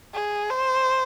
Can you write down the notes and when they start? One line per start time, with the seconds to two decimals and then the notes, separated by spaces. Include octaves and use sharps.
0.14 G#4
0.50 C5